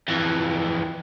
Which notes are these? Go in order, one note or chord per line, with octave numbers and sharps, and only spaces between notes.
F2 E3